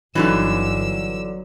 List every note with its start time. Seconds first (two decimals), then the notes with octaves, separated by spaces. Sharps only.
0.15 G1 G2 D3 E3 F#3 D#4 E6